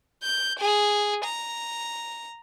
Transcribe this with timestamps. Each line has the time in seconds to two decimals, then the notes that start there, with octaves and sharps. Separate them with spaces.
0.23 G6
0.60 G#4
1.25 A#5